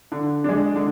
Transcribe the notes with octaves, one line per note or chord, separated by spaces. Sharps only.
D3
G#3 D4
D3